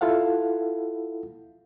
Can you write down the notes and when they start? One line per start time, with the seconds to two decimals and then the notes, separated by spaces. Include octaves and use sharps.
0.01 E4 F4 A4 F5 F#5